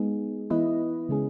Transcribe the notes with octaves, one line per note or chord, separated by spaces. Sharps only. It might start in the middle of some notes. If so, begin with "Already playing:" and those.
Already playing: G#3 B3 D#4 G#4
E3 B3 E4 B4 D#5
C#3 G#3 C#4 G#4